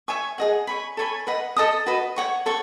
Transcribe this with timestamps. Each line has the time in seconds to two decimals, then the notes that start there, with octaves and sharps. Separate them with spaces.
0.08 C#5 E5 G#5 C#6
0.38 G#4 D#5 F#5
0.67 C#5 G#5 B5
0.97 A4 C#5 G#5 B5
1.27 B4 D#5 F#5 B5
1.56 A4 D#5 A5 D#6
1.86 F#4 B4 D#5
2.16 C#5 F#5 C#6
2.46 A4 C#5 F#5 C#6